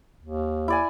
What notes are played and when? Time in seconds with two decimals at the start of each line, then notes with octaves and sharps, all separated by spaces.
0.23 D#2
0.68 E4 D5 G#5